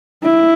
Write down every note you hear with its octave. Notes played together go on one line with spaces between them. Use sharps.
E4